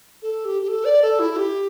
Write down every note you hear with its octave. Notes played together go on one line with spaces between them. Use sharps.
A4
G4
G4
A4
D5
A4
E4
G4